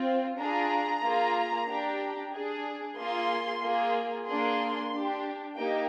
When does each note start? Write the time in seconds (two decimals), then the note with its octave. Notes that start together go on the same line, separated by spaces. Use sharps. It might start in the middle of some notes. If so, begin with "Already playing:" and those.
Already playing: C4 F4
0.38 D4 F4 G#4 A#5
1.03 A#3 F4 G#4
1.68 D4 G4
2.33 D4 G#4
2.97 A#3 F4 G#4 C6
3.61 A#3 F4 G#4
4.26 A#3 D4 G#4 C6
4.92 D4 G4
5.55 A#3 D#4 G4 G5